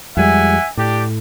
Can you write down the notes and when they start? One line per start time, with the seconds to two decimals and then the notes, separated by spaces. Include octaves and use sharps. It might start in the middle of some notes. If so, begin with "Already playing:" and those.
0.17 F2 G3 G#3 E5 F#5 G#5
0.77 A2 D4 G4